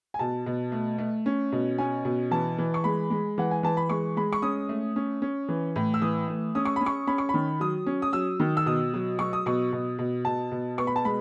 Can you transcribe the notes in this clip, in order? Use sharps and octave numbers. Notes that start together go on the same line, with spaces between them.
G#5
B2 A5
B2
A3
A3
C#4
B2
C#4 G#5
B2
E3 A5
E3
C#6
G#3 B5
G#3
E3 F#5
G#5
E3 A5
B5
G#3 C#6
G#3 B5
C#6
C#4 D#6
A3
C#4
C#4
E3
A2
E6
E3 D#6
A3
C#4 D#6
C#6
C#4 B5
C#6
C#4 B5
C#6
D#3 B5
F#3 D#6
C#4
D#6
F#3 E6
D#3
E6
B2 D#6
F#3
F#3 C#6
D#6
B2 C#6
B2
B2
B2 A5
B2
B3 C#6
B5
A5
G#3 B5